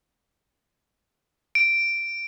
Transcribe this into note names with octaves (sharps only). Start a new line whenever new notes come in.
D7